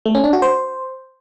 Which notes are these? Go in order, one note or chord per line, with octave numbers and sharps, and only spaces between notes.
A3
C#4
D4
F#4
C5